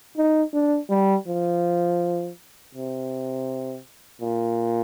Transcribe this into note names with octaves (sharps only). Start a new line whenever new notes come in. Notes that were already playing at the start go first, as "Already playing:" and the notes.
D#4
D4
G3
F3
C3
A#2